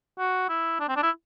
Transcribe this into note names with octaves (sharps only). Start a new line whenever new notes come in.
F#4
E4
D4
C4
D4
E4